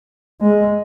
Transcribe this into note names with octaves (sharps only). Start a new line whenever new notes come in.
G#3